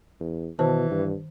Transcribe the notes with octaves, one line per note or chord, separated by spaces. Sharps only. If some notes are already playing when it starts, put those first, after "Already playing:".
E2
B2 D#3 E3 C5 A5
G2